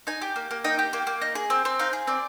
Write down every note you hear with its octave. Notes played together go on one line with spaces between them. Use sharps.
D#4 G#5
G4
A#3
A#3
D#4 G5
G4
A#3
A#3
D#4
G#4
C4
C4
D#4 F5
G#4
C4 D5